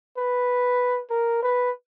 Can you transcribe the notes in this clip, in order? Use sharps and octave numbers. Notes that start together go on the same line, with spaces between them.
B4
A#4
B4